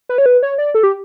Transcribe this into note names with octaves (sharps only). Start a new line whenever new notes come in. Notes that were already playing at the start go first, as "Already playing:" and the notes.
B4
C#5
B4
C#5
D5
A4
G4